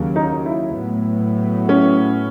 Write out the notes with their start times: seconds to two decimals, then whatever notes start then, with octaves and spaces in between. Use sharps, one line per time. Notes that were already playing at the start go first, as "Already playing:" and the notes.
Already playing: D#2 C#3 F#3
0.16 D#4
0.46 E4
0.77 A2 F#3 B3
1.69 C#4